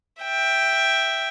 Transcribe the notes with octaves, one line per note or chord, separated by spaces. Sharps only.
E5 G5